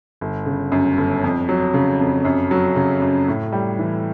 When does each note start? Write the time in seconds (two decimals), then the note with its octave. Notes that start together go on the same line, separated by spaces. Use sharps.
0.21 G1
0.46 C#3
0.72 F#2
0.98 G1
1.24 F2
1.49 F#3
1.74 C#3
2.00 F2
2.25 F#2
2.51 F#3
2.76 C#3
3.02 F#2
3.28 A2
3.52 G3
3.79 E3